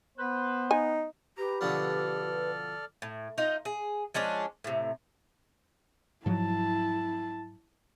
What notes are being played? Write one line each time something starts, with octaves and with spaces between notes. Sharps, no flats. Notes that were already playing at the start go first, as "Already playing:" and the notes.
B3 B4 C5
D#4 G#5
G4 B4 A#5
B2 D3 F3 A4 D5 F6
A2
D#4 F4 D#5
G#4
F3 G#3 C#4 D4
A2 C3
G#2 F3 F#3 E4 A5